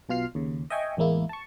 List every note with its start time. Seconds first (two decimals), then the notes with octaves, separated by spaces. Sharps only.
0.09 B1 B2 F4 F6 C7
0.35 D#2 C#3
0.70 D#5 E5 G5 G#5 C#6
0.97 A1 E2 G#3 A#3 E4
1.29 A5 C#6